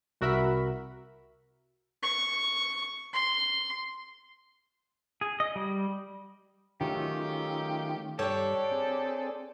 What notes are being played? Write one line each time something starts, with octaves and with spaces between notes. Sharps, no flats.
C2 F#4 A#4 E5 B5
C#6
C6
G#4
D#5
G3
D#3 F#3 A3 C#4 D#4 F4 G4
G2 D4 G4 A4 C#5
C4 G#4